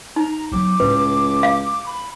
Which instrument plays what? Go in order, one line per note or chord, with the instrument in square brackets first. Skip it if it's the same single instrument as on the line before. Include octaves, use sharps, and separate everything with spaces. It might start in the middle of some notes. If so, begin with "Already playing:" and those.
[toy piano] D#4 [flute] A#5
[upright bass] F#3 B3 [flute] D6
[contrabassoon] C#2 [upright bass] A2 [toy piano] B4
[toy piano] F5
[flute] B5